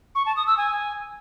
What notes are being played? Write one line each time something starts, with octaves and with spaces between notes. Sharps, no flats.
C#6
A5
D#6
E6
G#5